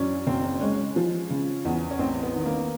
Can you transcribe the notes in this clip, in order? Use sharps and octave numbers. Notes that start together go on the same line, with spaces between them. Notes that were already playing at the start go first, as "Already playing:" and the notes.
Already playing: F#2 C#4 D4 E4
F#1 C4
G#3 C#4
F3
C#3
E2
C#4
A1 C4
B3
D#3
A#3